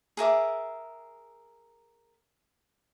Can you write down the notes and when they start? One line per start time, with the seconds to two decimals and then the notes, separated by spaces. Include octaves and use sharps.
0.17 G#4 A#4 E5 D6